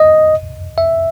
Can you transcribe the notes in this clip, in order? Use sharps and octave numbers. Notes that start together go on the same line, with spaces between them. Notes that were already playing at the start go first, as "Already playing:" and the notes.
Already playing: D#5
E5